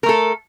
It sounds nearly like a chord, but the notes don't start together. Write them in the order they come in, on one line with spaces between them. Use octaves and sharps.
A#4 A3 A4